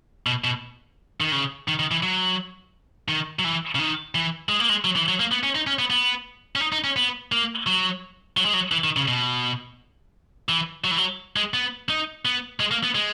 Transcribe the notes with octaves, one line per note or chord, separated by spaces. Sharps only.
B2
B2
D#3
C#3
D#3
D#3
E3
F#3
D#3
F#3
E3
C#3
D#3
E3
G#3
A#3
G#3
F#3
E3
F#3
A#3
B3
C#4
D#4
C#4
B3
B3
C#4
D#4
D#4
C#4
B3
A#3
F#3
F#3
G#3
F#3
E3
D#3
C#3
B2
E3
F#3
E3
F#3
G#3
B3
D#4
B3
G#3
A#3
B3
G#3